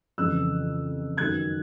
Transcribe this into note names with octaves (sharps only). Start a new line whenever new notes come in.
F2 C#3 E3 E6 F#6
F#2 D#3 F#3 F#6 G#6